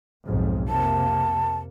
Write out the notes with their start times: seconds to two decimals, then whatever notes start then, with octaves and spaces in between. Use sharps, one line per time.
0.24 B1 F2 G#2
0.68 F2 C3 A#3 A5